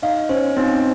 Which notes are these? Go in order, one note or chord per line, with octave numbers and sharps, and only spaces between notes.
D#4 F5
C#4 C5
C4 D#4